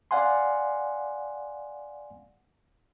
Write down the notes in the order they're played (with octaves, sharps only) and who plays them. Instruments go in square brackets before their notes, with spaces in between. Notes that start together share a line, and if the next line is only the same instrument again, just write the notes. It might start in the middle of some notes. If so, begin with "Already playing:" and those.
[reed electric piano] D5 F5 F#5 G#5 C6